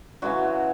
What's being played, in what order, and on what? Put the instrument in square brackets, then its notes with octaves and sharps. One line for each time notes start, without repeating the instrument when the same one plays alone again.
[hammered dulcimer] C#3 E3 F#3 G#3 F#4